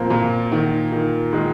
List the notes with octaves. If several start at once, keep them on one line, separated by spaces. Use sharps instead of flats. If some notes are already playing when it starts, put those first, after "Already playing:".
Already playing: A#2 F3 A#3 C4
A#2
D#3
D#3
D#3 G#3